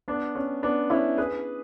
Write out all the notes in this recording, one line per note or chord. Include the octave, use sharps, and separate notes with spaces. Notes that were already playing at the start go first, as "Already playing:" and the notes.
B3 D4
C#4
B3 D4
C#4 E4
G#4 B4